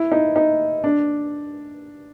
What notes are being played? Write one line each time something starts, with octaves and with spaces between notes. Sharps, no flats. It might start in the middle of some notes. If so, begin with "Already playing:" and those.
Already playing: E4
D#4
D#4
D4